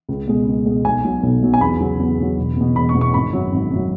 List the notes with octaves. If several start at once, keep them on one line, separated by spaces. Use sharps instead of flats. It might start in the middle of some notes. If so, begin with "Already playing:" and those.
C#2
B2 G#3
C#2
B2 G#3
B1 G#5
B2 F#3
B1
B2 F#3
G#5
E2 B5
C#3 F#3
E2
C#3 F#3
E1
E2 B2
E1 B5
C#6
E2 B2
C#6
G#1 B5
F#2 F#3
G#1
F#2 F#3